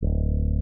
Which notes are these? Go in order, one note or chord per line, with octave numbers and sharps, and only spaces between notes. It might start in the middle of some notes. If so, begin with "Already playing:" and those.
D1